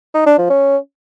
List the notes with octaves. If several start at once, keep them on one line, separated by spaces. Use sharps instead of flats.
D#4
D4
F3
C#4